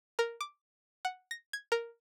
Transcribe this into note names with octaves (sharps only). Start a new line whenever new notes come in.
A#4
D6
F#5
A#6
G#6
A#4